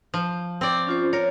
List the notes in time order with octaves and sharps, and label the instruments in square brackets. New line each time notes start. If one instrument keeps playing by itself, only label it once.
[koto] F3
C4 D5
[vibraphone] C#4 F4 C5
[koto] A#4 [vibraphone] C#5